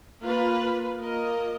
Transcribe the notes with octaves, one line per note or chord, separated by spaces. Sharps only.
A#3 F4 B4
A#3 F4 A#4 D#5